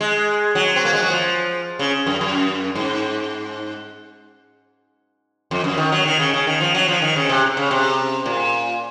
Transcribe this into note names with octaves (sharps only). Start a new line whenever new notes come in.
G#3
F#3
C4
A#3
G#3
F#3
F3
C#3
F#2
F#2
G#2
F2
F#2
D#3
F#3
D#3
C#3
C#3
D#3
F3
F#3
F3
D#3
C#3
C3
C#3
C3
A#2